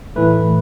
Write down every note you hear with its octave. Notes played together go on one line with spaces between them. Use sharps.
A2 E3 A3 B4